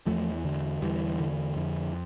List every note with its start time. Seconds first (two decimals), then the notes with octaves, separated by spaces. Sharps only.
0.07 E2 F3 A3
0.45 D3
0.81 E2 E3 G3
1.20 D3
1.56 F2